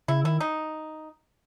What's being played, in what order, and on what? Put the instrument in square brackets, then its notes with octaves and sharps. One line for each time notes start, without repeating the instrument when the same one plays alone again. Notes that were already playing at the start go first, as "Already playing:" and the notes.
[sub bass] C#3 [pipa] E4
[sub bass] D#3 [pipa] E4
[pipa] D#4